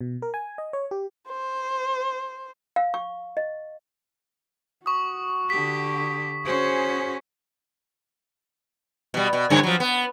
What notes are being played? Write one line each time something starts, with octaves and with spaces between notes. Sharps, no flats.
B2
A#4
G#5
D#5
C#5
G4
C5
F5
C#6
D#5
F#4 C#6 D#6
D3 G4 B6
C#4 F#4 G#4 C5
B2 G3
B2
G2 D3 C#5
F3 F#3
B3